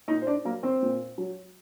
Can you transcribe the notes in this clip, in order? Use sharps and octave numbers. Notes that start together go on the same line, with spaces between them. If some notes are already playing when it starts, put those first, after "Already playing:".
A#2 D#4 D#5
C5
D4 D5
F#3 A#3 A#4
C4 C5
A#2
F#3